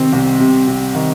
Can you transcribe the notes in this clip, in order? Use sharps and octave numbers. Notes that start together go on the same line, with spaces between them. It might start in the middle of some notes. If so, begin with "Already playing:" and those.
Already playing: C3 D#3 C4
C2
C3
C3
D#3